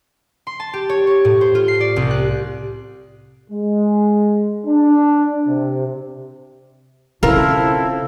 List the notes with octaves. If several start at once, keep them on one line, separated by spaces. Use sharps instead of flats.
C6
A5
G4
C#5
C#5
A2
C5
F4
C7
D5
C2
F#6
G#3
D4
C3
C#3 C4 E4 F4 A4 A#4